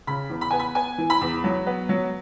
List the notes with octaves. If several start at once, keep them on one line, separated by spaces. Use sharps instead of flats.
C#3 B5
E2
B5
B3 G#5
B5
B3 G#5
E3
B5
E2
F#3
B3
F#3